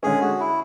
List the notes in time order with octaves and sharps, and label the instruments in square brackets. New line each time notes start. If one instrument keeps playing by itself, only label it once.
[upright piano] D3 G#3 C#4 [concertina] G#4
[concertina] F#4
E4